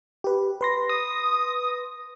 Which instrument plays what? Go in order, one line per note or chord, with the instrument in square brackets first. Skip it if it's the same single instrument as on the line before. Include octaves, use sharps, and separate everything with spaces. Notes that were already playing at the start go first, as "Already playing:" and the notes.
[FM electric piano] G4 B4
B4 C6 A#6
[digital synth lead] D#6